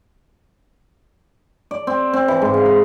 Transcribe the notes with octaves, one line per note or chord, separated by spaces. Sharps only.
D5
C4
C4
E3
G#2
F5
B5